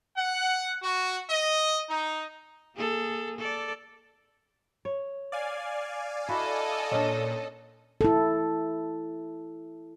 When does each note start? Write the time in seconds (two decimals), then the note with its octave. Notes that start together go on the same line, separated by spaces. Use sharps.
0.16 F#5
0.83 F#4
1.29 D#5
1.90 D#4
2.75 A#3 G#4 A4
3.38 A4 D5
4.85 C#5
5.32 D5 F5 G#5
6.29 E4 F#4 A4 D#5
6.91 A#2 C#4 D4
8.01 E4 A4